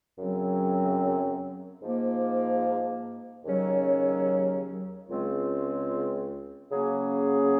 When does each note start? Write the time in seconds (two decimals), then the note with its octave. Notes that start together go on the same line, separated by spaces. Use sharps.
0.18 F#2 C#3 F#3 C4
1.82 G#2 F3 A#3
3.45 D#2 C#3 F#3 C#4
5.09 C#2 C#3 G#3 C4 F4
6.72 C#3 F#3 A#3 C#4 G#4